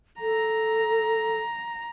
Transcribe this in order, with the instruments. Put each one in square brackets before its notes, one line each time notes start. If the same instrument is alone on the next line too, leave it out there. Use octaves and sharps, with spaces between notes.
[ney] A4 [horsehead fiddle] A#5